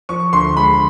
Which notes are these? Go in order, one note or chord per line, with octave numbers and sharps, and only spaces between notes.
F3 C#6
D2 C6
G#3 B5